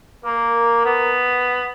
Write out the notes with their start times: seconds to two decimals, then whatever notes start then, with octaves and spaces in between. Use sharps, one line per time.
0.25 A#3 A#4
0.85 B3